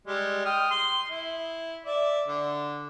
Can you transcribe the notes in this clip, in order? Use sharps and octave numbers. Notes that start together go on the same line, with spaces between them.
G3 G#3
G5 D#6 F6
C6
E4
D5 E5
D3